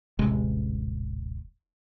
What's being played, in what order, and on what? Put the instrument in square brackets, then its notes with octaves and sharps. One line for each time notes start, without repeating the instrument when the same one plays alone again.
[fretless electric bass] D#1 A1 C3 G#3